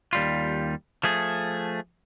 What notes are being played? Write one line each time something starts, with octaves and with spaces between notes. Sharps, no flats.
D#2 G3 F4
F3 A3 G#4